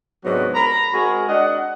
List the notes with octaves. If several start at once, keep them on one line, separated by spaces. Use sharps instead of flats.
G#2 C3 F#3 B3 D4 F#4
A#5 B5
G#3 C4 F#4 G#4 A#4
D4 D#5 F#5